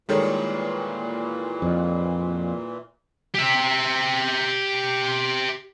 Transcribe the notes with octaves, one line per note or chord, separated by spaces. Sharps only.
A#2 D#3 E3 G3 G#3 A4 C#5
F2
G4 E5